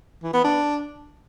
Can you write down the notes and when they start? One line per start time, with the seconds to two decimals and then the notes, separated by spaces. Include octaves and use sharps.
0.23 E3
0.34 B3
0.44 D4